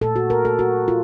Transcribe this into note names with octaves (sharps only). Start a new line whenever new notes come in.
A#2 A3 A4
F#4
A#4
A4
F#4
F4